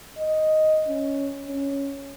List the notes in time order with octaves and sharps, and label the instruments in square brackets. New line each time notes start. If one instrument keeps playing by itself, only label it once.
[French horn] D#5
C#4
C#4